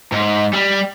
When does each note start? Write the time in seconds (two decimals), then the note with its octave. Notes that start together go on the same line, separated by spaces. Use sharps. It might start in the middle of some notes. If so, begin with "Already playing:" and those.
0.12 G#2
0.54 G3